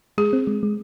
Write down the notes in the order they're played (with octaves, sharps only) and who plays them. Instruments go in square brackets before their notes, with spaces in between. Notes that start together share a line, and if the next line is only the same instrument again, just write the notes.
[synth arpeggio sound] G#3 [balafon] G#4
[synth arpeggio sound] C4
G#3
G#3